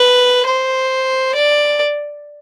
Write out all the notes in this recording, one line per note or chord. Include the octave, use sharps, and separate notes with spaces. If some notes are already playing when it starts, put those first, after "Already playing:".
Already playing: B4
C5
D5